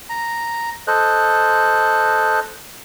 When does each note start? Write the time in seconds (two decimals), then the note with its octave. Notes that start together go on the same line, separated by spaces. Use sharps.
0.09 A#5
0.87 A4 C5 D#5 F#6